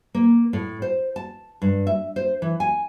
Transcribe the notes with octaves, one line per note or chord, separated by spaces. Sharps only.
A#3
A2
C5
A5
G2
E5
C5
E3
G#5